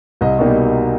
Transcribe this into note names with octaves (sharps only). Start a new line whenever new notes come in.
C2 D#5
B2 G3 A#3 D#4